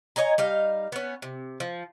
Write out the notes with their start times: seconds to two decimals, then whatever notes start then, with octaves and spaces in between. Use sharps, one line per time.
0.16 C#5 D#5 G#5 A#5
0.38 G3 D#4 F5
0.92 B3 C#4
1.22 C3
1.60 F3